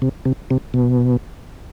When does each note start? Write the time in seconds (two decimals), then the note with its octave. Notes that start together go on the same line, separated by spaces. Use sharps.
0.02 C3
0.25 C3
0.50 C3
0.74 B2